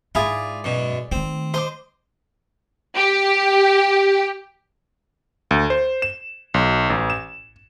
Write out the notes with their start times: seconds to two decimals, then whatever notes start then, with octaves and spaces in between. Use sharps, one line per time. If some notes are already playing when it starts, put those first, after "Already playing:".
0.15 G#2 E4 F4 G#4 D5
0.64 F#2 B2
1.12 D#3 A3 C4
1.54 C5 D#5 C6 D6
2.96 G4
5.51 D2
5.70 C5
6.02 E7
6.54 B1
6.90 A1
7.10 E7